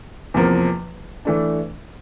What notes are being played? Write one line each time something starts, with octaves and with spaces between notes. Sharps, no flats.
E2 C3 F3 A#3
E3 A3 D4